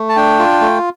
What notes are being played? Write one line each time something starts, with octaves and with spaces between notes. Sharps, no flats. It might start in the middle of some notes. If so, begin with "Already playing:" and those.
Already playing: A3
A5
D4 G5
F4
A3